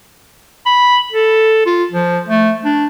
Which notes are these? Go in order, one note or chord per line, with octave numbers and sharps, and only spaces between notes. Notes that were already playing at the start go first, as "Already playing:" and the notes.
B5
A4
F4
F3
A3
D4